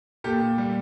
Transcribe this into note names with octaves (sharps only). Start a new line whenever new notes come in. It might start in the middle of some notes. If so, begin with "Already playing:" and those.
A#2 G4 A4
A#2
G3